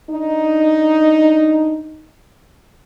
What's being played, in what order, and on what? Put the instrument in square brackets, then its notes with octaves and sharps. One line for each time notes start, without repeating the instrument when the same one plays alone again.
[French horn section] D4 D#4